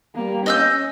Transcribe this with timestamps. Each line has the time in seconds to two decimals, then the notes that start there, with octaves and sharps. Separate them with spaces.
0.15 G3 A#3
0.46 C#4 D#5 E6 G6